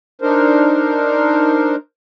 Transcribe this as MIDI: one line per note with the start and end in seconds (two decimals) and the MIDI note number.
0.22 1.75 62
0.22 1.75 63
0.22 1.75 70
0.22 1.75 72